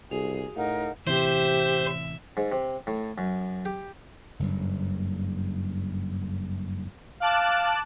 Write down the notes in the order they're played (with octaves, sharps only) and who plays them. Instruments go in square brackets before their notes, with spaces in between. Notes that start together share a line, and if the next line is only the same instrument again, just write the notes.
[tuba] C2 [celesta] F#4 F7 [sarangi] G#4
[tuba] A2 [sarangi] D#4 [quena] A#4 [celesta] F5 F#5
[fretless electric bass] A1 C3 E3 [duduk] G4 [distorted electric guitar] C5 [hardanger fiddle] E5
[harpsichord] G#2
C3
A2
F#2
G4
[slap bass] F#1 G2
[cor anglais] F5 [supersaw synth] A5 D6 F#6